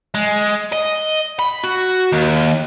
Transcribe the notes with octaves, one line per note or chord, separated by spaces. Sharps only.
G#3
D#5
B5
F#4
D#2